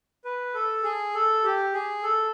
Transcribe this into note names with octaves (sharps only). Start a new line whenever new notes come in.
B4
A4
G#4
A4
G4
G#4
A4